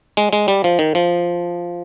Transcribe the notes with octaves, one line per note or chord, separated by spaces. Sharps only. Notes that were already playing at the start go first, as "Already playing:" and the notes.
G#3
G#3
G3
F3
D#3
F3